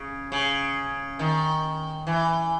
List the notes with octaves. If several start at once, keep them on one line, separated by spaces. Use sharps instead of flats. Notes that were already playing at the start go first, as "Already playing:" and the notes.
Already playing: C#3
C#3
D#3
E3